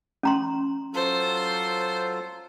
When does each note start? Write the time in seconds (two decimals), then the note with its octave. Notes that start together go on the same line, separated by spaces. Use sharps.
0.23 C#4 A#5 C6
0.94 F#3 F4 A4 C5